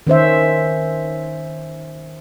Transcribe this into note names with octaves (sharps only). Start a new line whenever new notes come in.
D#3 C#4 C5 E5